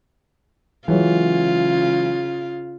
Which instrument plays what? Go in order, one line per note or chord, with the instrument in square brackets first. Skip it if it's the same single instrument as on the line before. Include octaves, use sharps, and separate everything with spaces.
[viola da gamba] C#3 F4 [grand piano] E3 F#3 G#3